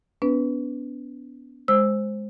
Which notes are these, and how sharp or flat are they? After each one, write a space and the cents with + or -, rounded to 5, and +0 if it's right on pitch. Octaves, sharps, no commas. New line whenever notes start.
B3 +10 D4 -40 B4 +0
G#3 +0 C5 +10 E6 +0